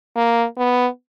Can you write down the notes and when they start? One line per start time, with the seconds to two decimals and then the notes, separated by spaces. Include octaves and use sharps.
0.16 A#3
0.58 B3